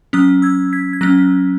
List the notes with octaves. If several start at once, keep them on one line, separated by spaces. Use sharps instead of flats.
F#3 C#4 D#6 F#6
E6 G#6
G#6 B6
G#6
F#3 C#4 F#6 A#6